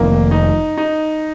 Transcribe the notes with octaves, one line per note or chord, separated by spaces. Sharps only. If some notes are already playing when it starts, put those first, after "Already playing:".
Already playing: F1 F2 D#3 A#3
D#4
D#4